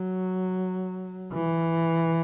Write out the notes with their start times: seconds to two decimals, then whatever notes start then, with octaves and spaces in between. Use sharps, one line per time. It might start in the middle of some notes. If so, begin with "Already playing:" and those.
Already playing: F#3
1.33 E3